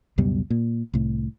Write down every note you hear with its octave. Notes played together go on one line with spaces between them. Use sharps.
C#2 F#2 B2 G3
A#2
C2 A2